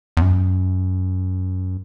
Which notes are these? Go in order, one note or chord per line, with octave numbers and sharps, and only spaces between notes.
E2
F#2